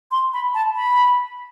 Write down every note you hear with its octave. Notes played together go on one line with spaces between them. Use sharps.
C6
B5
A5
B5